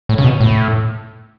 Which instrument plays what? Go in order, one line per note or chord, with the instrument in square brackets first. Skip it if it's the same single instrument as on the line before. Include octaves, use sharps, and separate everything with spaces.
[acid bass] A2
C#3
B2
A2